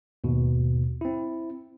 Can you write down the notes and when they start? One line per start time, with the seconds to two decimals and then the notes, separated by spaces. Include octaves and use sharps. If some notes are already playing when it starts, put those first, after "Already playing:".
0.24 D#2 G#2 B2
1.01 C4 E4